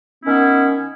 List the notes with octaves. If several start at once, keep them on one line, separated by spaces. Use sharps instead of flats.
D#3 B3 C#4 E4